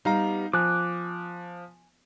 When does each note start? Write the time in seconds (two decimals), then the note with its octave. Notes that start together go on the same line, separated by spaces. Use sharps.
0.05 G3 B3 D#4 F5 A#5
0.53 F3 G#5 D6 F#6